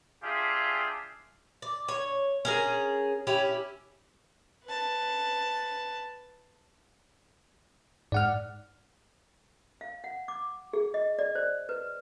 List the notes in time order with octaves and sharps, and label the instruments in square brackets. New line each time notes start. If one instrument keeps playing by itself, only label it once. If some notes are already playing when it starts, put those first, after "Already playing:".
[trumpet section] D4 F4 G4 G#4 E5 F5
[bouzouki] D5
C#5
C#4 G#4 A#4
C#4 E4 G4
[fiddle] B4 A5
[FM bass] G#2 [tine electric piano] D5 F#5 F6
[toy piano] F5
F#5
D6
G#4
D#5
D5
C5
B4